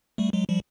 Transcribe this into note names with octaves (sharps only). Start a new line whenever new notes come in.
G3 A3
F#3 G#3
F3 G3